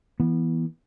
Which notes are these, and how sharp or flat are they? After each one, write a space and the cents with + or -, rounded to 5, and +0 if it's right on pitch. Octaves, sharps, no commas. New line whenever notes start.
E3 +0 B3 -20